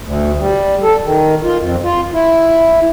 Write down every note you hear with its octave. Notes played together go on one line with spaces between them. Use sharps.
D2
G3
A4
D#3
F4
F2
F4
E4